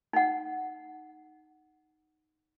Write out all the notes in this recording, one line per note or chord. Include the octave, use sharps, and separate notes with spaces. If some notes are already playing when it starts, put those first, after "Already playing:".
D#4 F#5